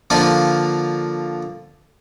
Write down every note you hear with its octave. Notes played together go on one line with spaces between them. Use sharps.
D3 F3 A#3 F4